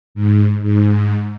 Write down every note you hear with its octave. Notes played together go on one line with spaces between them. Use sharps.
G#2
G#2